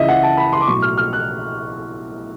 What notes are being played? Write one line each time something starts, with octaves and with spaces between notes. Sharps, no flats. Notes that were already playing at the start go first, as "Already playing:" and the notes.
Already playing: C#2 C#3 E3 D#5 E5
F#5
A5
B5
C6
D6
B1 A2 F#3 C#6
F6
F6
F#6